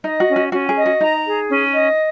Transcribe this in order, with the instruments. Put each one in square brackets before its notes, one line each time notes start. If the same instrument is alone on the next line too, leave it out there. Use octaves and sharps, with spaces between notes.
[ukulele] D#4 [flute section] D#5
[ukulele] F#4
[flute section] C#4
[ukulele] F#4
[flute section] C#4 [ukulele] F#4
[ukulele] G#4
[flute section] D#5
[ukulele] F#4
[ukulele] D#4 [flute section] A#5
[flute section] G#4
C#4
D#5